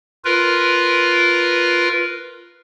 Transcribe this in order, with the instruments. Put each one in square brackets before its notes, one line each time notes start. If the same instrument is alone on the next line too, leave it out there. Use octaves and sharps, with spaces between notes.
[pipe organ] F4 A#4 B4